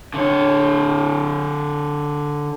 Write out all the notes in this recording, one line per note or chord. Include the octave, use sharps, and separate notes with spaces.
D3 C#5